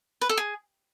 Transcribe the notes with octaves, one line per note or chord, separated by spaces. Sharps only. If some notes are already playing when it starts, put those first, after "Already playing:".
B4
A4
G#4